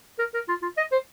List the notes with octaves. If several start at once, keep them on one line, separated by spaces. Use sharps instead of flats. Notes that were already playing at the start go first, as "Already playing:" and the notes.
A#4
A#4
F4
F4
D#5
C5